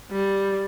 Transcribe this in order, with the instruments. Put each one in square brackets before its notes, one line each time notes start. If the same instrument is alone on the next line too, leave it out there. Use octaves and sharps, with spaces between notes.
[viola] G3